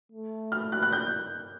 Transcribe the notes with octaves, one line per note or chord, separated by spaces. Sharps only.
A3
F6
F#6
F#6
G6